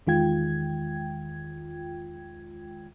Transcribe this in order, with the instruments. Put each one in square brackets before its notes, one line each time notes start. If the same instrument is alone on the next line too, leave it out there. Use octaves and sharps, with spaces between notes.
[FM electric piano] E2 D#3 G#3 F4 G5 G#6